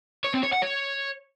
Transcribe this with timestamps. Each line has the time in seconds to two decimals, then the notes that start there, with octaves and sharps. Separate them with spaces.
0.24 C#5
0.34 C4
0.43 C#5
0.53 F#5
0.62 C#5